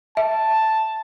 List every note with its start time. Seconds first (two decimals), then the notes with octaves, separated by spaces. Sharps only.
0.17 E5 A5